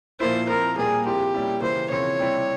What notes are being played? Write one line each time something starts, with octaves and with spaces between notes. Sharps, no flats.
A#2 F3 A#3 E4 C5
F3 C4 E4 A#4
A#2 G3 A#3 G#4
F3 C4 E4 G4
A#2 G3 C#4 E4
C#3 E3 A#3 E4 C5
C#3 F3 C4 E4 C#5
C3 G3 C4 E4